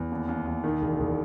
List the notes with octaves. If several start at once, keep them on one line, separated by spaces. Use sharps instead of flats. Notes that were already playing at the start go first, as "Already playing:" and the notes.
Already playing: E2
D#2
D#2
D#2
D#3
E1
E1